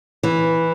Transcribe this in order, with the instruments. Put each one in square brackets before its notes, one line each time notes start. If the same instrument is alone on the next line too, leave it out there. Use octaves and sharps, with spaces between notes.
[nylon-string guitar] E3